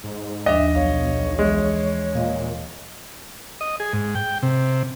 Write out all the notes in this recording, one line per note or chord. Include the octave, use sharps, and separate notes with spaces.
G#2
D#2 F3 D4 D#5 E5
B1 C#5 F5
E3 G#3
A#2 D#5 F5
D#5
G#4
G#2
G5
C3